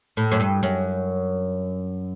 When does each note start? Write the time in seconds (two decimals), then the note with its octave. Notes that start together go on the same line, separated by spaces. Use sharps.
0.17 A2
0.32 F#2
0.40 G2
0.63 F#2